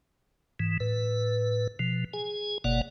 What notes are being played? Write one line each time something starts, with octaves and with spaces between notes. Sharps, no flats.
G#2 E3
A2 B4
B2 F3
G#4 G#5
F#1 B2 A#3 D5 F#5